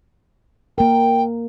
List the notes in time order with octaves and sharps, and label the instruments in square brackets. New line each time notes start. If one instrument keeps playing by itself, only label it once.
[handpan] A#3 A#4 [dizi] G5